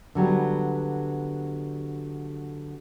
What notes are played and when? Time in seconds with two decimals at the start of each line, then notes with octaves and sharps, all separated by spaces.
0.15 D3 F#3 G3 B3